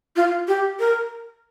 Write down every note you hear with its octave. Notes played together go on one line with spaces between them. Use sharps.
F4
G4
A#4